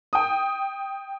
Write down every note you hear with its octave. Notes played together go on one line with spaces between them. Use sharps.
G5 D#6